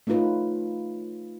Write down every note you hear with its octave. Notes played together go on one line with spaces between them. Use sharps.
A3 C#4 D#4 F4 B4